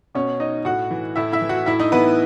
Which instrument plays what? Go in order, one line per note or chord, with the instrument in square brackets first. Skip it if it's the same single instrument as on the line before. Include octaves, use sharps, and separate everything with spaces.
[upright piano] B2 C#4 C#5
D#4 D#5
A2 F#4 F#5
E3
A2 E4 E5
E4 E5
E3
F#4 F#5
A2 E4 E5
D#4 D#5
E3 B3 B4